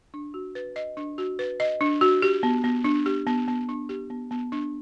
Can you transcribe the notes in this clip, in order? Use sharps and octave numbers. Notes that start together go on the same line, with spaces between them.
D4
F#4
B4
D#5
D4
F#4
B4
D#5
D4
F#4
G4
B3
B3
D4
G4
B3
B3
D4
G4
B3
B3
D4